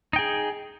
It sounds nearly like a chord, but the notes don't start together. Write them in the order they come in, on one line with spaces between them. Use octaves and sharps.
D#4 G5 G#4